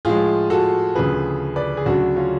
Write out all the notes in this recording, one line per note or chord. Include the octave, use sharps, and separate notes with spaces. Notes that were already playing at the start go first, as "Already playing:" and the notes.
A2 F3 G#3 F4 G#4
F#4 A4
D2 C#3 F3 G#4 B4
B4 D5
G#4
D2 C#3 F#3 D4 F#4
C#4 F4